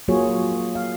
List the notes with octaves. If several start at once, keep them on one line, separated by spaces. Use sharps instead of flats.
F#3 A#3 F4 F#4 G#4 C#5
F5